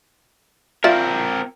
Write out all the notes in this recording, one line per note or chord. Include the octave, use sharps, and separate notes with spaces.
C4 F4 A#4 D5 E5